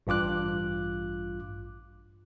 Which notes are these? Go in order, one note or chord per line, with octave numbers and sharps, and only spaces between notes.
A1 G2 F4 D6 F#6